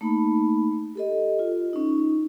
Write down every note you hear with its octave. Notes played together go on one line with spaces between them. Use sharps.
A3 A#3 D#4 A5 B5
G4 A4 D#5
F4
C#4 D#4